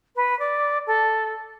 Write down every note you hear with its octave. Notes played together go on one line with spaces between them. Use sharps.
B4
D5
A4